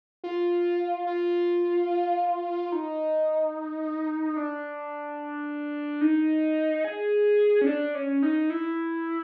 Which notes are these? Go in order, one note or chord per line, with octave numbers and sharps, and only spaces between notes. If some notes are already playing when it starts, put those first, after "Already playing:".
F4
F4
D#4
D4
D#4
G#4
C#4
D4
C#4
D#4
E4